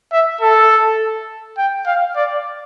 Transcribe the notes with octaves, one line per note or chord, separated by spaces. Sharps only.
E5
A4
G5
F5
D5